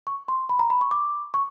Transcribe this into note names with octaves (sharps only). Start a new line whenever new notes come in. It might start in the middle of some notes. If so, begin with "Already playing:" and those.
C#6
C6
B5
A#5
B5
C#6
D6
C#6